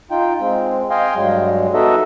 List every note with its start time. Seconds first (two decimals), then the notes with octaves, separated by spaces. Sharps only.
0.11 D#4 F4 G5
0.40 G#3 C4
0.90 D#5 F5 G5 G#5 C6
1.16 G2 F#3 G#3
1.74 B3 D#4 F#4 A4 D#5 E5